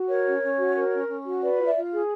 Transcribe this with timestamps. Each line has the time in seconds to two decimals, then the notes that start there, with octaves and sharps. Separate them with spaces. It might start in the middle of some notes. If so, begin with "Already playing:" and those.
Already playing: F#4
0.08 A#4 C#5
0.25 C#4
0.42 C#4
0.59 F#4
0.75 A#4
0.92 C#4
1.08 C#4
1.26 F#4
1.42 B4 D5
1.59 F4
1.64 D5 E5
1.75 F4
1.92 G#4